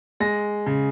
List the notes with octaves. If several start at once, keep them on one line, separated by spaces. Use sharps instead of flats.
G#3 A#6
C#3